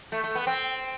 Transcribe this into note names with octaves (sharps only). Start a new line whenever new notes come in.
A3
A3
B3
C4